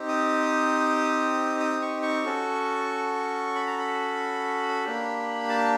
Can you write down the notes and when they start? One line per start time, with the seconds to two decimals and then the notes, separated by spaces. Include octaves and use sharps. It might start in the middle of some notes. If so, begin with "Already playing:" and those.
Already playing: C4 D#4 G4
0.08 D#6
1.60 D#6
1.82 C#6
2.03 C#6
2.25 C#4 F#4 A4
3.55 B5
3.67 A#5
3.78 B5
4.84 A#3 D4 G4
5.49 A5